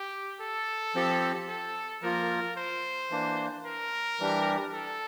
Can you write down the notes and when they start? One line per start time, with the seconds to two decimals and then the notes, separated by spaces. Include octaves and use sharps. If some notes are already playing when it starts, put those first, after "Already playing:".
Already playing: G4
0.40 A4
0.95 F3 C4 G4
1.48 A4
2.02 F3 A#3 F4 A#4
2.56 C5
3.10 E3 A#3 D4
3.65 A#4
4.20 E3 G3 D4 G4
4.74 A4